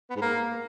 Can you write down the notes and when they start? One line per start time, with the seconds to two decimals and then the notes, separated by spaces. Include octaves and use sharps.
0.10 B3
0.16 G#2
0.22 A#3